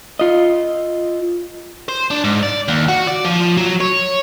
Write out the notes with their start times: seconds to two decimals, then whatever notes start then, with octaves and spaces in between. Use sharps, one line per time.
0.19 F4 D#5
1.88 C5
2.11 D4
2.24 G#2
2.43 D5
2.68 D#2
2.88 F#4
3.07 D5
3.25 F3
3.57 F#3
3.81 C#5